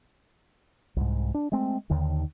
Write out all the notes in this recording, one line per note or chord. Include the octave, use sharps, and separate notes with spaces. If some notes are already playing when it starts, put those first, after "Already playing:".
C2 G#2
D4
G#3 A3 C4
D#2 D3 D#3